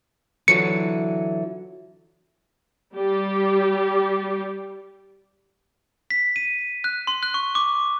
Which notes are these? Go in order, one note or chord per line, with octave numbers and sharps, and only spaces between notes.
D3 E3 F#3 C#7
G3 G4
B6
D#7
F#6
C6
F#6
C#6
D6